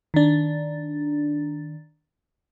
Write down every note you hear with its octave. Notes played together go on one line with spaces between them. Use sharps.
D#3 D4